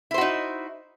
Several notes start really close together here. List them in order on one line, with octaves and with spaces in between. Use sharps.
E4 C5 F#4 D#4